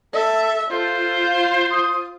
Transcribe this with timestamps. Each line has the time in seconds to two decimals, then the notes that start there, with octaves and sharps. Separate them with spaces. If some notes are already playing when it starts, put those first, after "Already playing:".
0.13 A4 E5
0.71 F4 A4 C5
1.26 F5
1.71 D#6